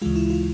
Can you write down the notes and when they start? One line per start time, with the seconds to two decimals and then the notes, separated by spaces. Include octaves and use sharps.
0.02 D2 C#3 E3 G#3 F4
0.16 E4
0.30 F4